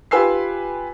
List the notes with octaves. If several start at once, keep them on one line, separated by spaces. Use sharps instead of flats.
F4 G4 B4 G#5 E6 C7